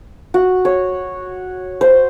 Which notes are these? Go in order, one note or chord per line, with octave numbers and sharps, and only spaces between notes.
F#4
C#5
C5